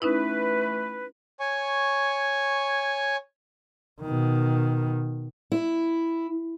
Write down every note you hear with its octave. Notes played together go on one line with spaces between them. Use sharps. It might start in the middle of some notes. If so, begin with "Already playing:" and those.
E3 A3 C#4 D#4 E4 B4
C#5 G#5 C#6
B2 D#3
E4